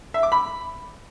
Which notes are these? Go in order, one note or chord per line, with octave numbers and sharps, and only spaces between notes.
E5
D6
B5